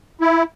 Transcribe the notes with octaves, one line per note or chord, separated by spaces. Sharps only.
E4